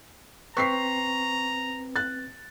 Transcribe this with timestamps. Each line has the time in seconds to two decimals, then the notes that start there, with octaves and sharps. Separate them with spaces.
0.57 C4 B4 A#5 C#6 B6 C7
1.96 F#6 A6